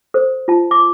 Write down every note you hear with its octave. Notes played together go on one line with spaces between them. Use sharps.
A4 C5
F4 A5
D6